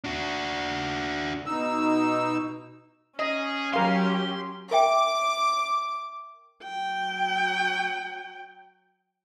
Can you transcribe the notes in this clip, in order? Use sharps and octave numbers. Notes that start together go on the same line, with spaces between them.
D4 F#4
B2 D#4 E6
C#4 G#4 D#5
F#3 G4 A#4 F5 C6
A#4 E5 G5 D6
F#3 G5